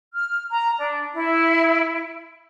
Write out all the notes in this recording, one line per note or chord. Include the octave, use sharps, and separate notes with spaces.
F6
A#5
D4
E4